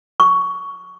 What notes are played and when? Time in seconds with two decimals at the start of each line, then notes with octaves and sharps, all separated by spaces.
0.20 C#6